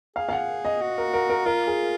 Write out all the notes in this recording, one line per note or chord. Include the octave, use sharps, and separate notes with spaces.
G#4 F5
F5
F#5
D#5
F#4
A#4
A#4
A#4
F4 A#4
G#4